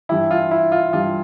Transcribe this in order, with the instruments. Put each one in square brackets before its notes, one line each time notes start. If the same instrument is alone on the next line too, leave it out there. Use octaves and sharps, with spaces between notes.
[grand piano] G2 E3 G3 E4
F4
E4
F4
G2 E3 G3 F4